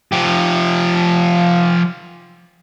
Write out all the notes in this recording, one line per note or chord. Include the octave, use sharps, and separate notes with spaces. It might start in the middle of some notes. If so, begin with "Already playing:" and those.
F3 G4